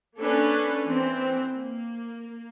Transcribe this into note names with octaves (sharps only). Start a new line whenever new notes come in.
A#3 C#4 D4 A4 B4
E3 C4
A#3